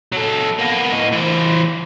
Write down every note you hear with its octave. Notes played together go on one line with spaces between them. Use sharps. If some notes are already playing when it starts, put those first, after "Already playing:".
F#3 A4
A#3 B3
A2 D#5
E3 C5